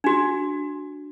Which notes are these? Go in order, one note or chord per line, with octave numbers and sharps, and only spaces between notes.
D4 F#4